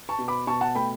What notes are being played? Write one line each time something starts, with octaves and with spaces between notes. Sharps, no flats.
A5 C#6
B2
B5 D6
B2 A5 C#6
F#5 A5
A3 G5 B5